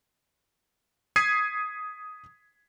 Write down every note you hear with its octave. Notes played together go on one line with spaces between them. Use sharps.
D#6 G#6 B6 C7 D#7